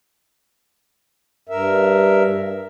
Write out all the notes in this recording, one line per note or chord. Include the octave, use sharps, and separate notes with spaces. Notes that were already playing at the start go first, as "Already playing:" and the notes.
G2 A#4 E5